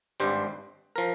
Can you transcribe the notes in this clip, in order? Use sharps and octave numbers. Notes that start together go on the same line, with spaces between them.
G#1 G2 G3 C5
F3 A#4